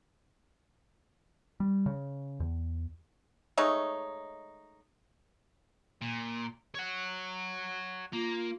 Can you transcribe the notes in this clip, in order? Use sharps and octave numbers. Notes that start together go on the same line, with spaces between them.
G3
C#3
E2
G#3 A3 D#4 C#5
A#2
C#5 F#5
A#3 F4